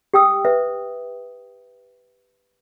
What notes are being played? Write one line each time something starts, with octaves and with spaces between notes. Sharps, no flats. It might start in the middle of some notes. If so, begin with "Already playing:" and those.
G4 G5 D#6 E6
B4 E5